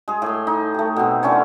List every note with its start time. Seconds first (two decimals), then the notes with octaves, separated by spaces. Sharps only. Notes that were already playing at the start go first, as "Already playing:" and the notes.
0.08 G#3 G#4
0.22 A2 C6
0.47 D#4
0.74 A3 G4
0.96 B2 C4
1.23 D3 E3 C#4 C#5